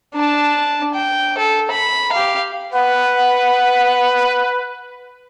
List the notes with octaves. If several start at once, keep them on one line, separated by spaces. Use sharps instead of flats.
D4 A5
G5
A4
B5
G4 F5
B4 F#5